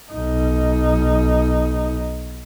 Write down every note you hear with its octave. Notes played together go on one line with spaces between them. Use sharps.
B1 D#4